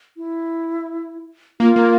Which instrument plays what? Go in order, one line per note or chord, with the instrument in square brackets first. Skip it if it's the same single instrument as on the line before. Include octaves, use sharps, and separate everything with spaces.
[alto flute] E4
[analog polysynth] A#3 [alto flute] F4
[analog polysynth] A#3